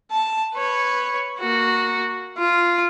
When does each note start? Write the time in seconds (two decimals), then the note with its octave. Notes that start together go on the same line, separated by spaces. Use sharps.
0.11 A5
0.55 B4 C#5
1.39 A#3 F#4
2.38 F4